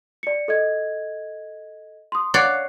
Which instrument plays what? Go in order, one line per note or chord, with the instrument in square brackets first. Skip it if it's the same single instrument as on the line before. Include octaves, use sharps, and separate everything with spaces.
[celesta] D5 C#7
A4 D#5 G#6
C6 D#6
[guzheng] C#5 D5 F#5 [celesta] F#6 C7